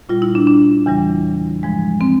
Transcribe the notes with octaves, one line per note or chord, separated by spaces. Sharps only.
A#2 G3 F4
E4
D4
D4
E2 C#3 E3 G3
G#2 F3 G#3
C4